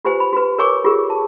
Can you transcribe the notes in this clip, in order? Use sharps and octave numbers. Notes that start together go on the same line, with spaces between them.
F4 G4 B4 C5 G#5
B5
F#4 B4
A#4 B4 C#5 G#5 C#6 D6
F4 G4 G#4 A#4
A5